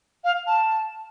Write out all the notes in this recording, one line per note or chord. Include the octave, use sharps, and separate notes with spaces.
F5
A5